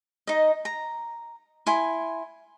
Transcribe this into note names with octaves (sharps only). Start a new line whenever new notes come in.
D#4 D#5
A#5
E4 G#5 C6